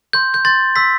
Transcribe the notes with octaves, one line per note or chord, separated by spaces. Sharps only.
C6 G6
G6
C6 G6 A6
C6 E6 G6 B6